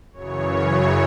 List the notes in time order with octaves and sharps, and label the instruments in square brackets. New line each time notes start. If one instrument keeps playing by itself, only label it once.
[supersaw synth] F#2 C#3 E3 C#5